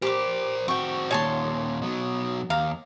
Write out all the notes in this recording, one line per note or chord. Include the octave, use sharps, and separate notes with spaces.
G4 A#4 C5 D6
C4 F#4 G5 C#6
D#2 A#2 C#5 A5 C6
B2 F#3
D#2 F5 A#5